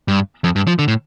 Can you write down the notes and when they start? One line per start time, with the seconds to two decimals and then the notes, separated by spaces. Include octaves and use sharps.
0.08 G2
0.44 F2
0.56 G2
0.67 F3
0.79 D3
0.88 A2